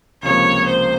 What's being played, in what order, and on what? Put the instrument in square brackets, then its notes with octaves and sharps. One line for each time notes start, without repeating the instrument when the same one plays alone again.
[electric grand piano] C#2 C3 F3 A#3 [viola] C#5
[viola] C5